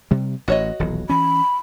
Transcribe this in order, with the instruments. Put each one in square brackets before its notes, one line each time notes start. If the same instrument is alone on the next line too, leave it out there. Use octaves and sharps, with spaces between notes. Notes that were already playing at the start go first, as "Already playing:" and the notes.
[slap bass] C3 G3
[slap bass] A1 [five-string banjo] F#4 C#5 D#5
[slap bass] D#1 B1 E3
[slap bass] E3 C#4 [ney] B5